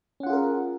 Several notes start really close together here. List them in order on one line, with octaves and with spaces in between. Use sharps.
C#4 F#5 F4 G#4 A#4